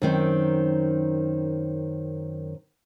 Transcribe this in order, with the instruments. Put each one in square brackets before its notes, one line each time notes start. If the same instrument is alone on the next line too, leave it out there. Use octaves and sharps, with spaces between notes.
[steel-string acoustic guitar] F#2 D#3 C4